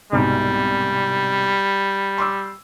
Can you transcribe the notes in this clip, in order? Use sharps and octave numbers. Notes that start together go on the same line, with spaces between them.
C2 G#2 B2 G3
C6 D6 E6